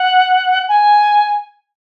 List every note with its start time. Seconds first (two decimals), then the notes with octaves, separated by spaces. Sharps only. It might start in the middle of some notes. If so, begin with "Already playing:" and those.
Already playing: F#5
0.68 G#5